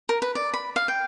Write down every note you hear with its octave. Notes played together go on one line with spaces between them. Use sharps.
A#4
B4
D5
B5
F5
G5